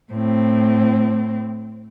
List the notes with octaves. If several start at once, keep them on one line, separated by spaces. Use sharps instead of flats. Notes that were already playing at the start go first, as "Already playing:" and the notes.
A2 C4